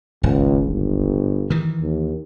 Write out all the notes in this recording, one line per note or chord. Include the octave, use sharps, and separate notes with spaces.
D#1 G#1 C#2
G1
D#3 E3
D#2